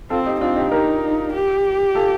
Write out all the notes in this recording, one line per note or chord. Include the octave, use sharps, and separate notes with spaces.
C4 F4 A4
D#4 G4
C4 D4 F4
D#4 G4
D#4 G4 A#4
G4
F4 A4